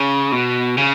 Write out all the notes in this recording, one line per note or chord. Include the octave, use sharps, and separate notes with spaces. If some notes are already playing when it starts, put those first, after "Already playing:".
Already playing: C#3
B2
C#3